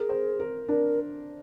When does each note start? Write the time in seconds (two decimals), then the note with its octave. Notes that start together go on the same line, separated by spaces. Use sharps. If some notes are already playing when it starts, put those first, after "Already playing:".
Already playing: G#4 A#4
0.09 C5
0.40 A#4
0.68 D4 A#4